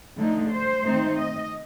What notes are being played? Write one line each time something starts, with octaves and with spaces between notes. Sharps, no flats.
D3 F3 A3 D#4
C5
D#3 A3 C4 D#4
D#5